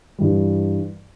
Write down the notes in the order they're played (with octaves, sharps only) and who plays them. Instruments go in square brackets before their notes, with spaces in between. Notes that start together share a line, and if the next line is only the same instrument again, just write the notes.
[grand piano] G2 E3 G3